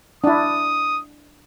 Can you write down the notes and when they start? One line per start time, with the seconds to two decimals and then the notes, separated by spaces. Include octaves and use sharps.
0.24 D4 E4 D#6